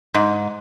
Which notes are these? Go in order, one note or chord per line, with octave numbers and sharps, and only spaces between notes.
G#2